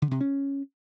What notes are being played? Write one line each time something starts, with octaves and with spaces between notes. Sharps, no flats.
D3
C3
C#4